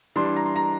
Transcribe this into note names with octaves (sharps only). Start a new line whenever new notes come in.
E3 G3 D4 C6
C6
A#5
C6
A#5